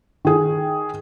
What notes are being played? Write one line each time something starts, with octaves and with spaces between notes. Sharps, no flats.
D#3 G#4